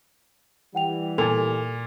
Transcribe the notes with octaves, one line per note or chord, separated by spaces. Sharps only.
E3 G3 F#5 G5 F7
A#2 A4 G#5 F7